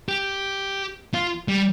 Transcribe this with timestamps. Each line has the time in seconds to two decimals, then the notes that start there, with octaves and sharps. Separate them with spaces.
0.09 G4
1.14 F4
1.48 G3